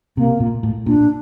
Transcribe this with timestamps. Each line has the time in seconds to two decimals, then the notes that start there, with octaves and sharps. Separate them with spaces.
0.17 C3 A#3
0.40 A#2
0.63 A2
0.86 A#2 D4